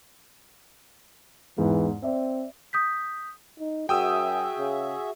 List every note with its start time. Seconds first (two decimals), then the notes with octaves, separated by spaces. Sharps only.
1.58 E2 G#2 E3
2.03 C4 D5 E5
2.73 D#6 G6 B6
3.60 D#4
3.89 F#2 F#4 G#4 E5 G5 D#6 E6
4.59 C#3